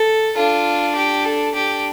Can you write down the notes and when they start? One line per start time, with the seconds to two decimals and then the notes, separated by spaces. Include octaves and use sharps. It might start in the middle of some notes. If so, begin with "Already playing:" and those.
Already playing: A4
0.37 D4 F4
0.96 G4
1.25 A4
1.55 D4 G4